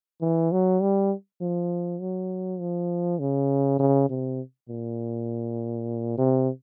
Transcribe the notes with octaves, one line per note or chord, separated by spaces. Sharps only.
E3
F#3
G3
F3
F#3
F3
C#3
C#3
C3
A#2
C3